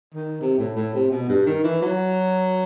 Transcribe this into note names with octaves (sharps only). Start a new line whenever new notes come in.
D#3
C3
A2
A2
C3
B2
G2
D#3
E3
F#3